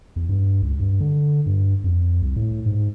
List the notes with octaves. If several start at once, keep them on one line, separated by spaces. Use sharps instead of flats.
E2
G2
C#2
G2
D3
G2
F2
C2
A2
G#2